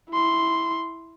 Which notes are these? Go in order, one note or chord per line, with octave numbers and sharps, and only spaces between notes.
E4 C6